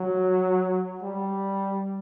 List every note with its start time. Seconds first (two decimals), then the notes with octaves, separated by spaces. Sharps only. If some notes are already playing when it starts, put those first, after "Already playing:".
Already playing: F#3
1.03 G3